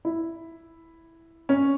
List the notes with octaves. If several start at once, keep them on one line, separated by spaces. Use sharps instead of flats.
E4
C#4